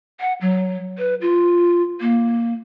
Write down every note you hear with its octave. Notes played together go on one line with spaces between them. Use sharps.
F#5
F#3
B4
F4
A#3